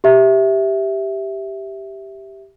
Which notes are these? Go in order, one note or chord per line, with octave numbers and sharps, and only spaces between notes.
G4 E5